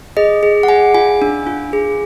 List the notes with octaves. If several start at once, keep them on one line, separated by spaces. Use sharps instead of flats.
G#4 D#5
G#4
F#5
G#4 G#5
F4 G#5
D4
F4
G#4